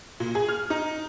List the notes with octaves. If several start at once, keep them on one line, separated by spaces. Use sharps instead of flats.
A#2
G#4
F6
D#4